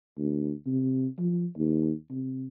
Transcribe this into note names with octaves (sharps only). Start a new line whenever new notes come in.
D2
C3
F3
D#2
C3